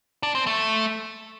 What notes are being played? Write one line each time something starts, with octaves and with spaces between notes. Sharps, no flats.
D4
C4
A3